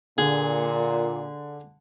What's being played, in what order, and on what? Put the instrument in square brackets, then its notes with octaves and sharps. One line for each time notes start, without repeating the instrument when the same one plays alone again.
[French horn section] A#2 [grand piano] D3 [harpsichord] G#4